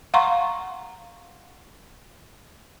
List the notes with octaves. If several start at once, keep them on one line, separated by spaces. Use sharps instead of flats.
F5 F#5 A#5 C6 C#6